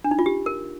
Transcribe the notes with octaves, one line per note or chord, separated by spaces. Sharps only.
D4
D#4
F4
G4
A#4